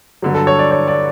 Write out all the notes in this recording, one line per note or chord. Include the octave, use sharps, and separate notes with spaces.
G2 D3 F#3
A4
C#5
D5
C#5
D5